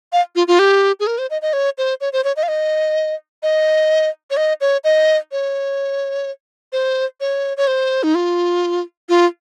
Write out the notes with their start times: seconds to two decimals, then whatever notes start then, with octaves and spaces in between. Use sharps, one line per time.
0.13 F5
0.36 F4
0.48 F4
0.59 G4
1.00 G#4
1.07 A#4
1.18 C5
1.30 D#5
1.42 D#5
1.53 C#5
1.78 C5
2.01 C#5
2.13 C5
2.24 C#5
2.36 D#5
2.43 F5
2.48 D#5
3.43 D#5
4.30 C#5
4.37 D#5
4.61 C#5
4.84 D#5
5.32 C#5
6.73 C5
7.20 C#5
7.57 C#5
7.67 C5
8.03 D#4
8.15 F4
9.09 F4